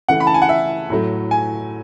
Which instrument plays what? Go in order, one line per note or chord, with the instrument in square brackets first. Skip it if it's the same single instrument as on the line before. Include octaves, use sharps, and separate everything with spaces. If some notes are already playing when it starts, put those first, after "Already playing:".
[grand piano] C#3 E3 A3 [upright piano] F#5
[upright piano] B5
A5
G#5
F#5
E5
[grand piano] A2 F#3 A3
[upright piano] G#5